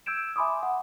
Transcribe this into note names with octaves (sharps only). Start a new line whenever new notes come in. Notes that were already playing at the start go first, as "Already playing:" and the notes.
E6 G6 G#6 D7 E7
E5 G#5 B5 C6 D6 D#6
F#5